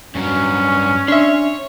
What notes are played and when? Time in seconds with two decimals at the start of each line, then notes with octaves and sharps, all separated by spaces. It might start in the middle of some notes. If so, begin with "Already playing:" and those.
0.15 G2 F#3 C#4
1.08 D4 C#5 E5 C6